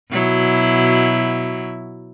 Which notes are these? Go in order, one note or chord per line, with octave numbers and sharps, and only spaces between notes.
B2 F#3 E4